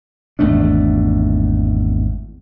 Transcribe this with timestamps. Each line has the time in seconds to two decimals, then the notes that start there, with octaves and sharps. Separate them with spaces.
0.39 G#1 E2 A3 D4